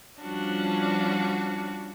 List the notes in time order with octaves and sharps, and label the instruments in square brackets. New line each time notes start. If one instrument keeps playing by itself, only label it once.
[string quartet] F3 G3 C#4 D4 F#4